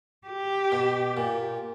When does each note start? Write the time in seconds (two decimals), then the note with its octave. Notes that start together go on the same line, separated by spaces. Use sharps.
0.27 G4
0.72 B2
1.17 A#2